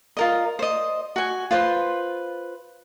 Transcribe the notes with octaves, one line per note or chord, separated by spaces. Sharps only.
F4 A#4 D#5
C5 D#5
F#4 G#5
F4 B4 C5 C6